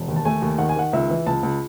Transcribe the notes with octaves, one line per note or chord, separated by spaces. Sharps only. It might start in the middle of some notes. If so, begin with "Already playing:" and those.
Already playing: E1
D#2
A5
A3 G#5
D#2
D#3 F#5
G#5
D#3 F#5
C#2 E5
E3
C#2 A5
C#2